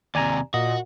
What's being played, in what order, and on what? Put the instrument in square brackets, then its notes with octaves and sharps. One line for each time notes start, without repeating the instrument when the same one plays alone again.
[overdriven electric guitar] D#2 C3 [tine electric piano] D5 G#5 A#5
[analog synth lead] A#2 [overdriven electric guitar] F#4 [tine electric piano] D#5